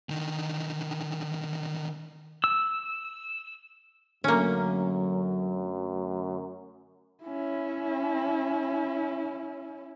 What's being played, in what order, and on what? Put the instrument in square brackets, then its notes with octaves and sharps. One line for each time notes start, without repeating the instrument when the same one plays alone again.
[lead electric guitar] D3 D#3
[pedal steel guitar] E6
[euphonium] F#2 [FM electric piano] D3 A3 [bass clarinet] F#3 [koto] A#3 C#4
[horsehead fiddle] C#4 E4